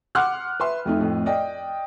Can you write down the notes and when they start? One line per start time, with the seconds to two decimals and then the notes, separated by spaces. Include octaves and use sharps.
0.15 F#5 C6 D6 F6 F#6
0.60 B4 E5 C6
0.86 F2 A3 D#4
1.00 F2 A2
1.26 D5 D#5 G5